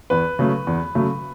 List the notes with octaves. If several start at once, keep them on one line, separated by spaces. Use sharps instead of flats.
E2 B4
C#3 F#3 A3
E2
C#3 F#3 A3